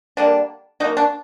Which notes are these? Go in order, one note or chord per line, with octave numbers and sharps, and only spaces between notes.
D3 G3 A#3 D4
F#3 A#3 D#4
D4